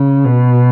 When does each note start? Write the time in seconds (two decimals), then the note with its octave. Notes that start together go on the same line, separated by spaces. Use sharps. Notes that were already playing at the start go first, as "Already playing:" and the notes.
Already playing: C#3
0.24 B2